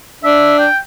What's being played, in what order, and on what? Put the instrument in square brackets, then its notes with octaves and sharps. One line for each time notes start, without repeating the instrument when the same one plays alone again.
[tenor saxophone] D4 [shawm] E5
[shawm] G5